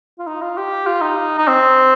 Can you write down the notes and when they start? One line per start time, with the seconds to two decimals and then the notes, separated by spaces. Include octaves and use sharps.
0.19 F4
0.27 D#4
0.42 F4
0.57 G4
0.86 F4
1.01 D#4
1.38 D#4
1.47 C4